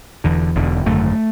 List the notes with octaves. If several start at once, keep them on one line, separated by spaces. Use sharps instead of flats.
E1 E2 D3
E1 E2 D3
G#1 F#2 D3 A3